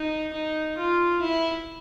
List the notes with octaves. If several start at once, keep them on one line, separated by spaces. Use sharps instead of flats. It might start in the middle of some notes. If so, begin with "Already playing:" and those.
Already playing: D#4
D#4
F4
E4